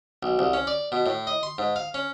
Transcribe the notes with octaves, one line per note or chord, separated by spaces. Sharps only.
B1
C2
C#4
D5
B2
A2
D#5
C6
G#2
F5
C#4